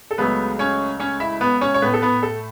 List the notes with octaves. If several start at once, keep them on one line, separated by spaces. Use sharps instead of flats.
A4
C#2 C#3 F#3 A3 B3 B4
C#4 C#5
C#4 C#5
E4 E5
B3 B4
C#4 C#5
C#5
A2 A3 B3 B4
A4
B3 B4
A4